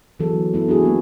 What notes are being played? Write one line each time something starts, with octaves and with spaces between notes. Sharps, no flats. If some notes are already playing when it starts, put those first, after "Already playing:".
D3 E3 F#3 B3 G#4 A4
A3 B3 E4
D4 E4 F#4 G#4
F3 A#3 B3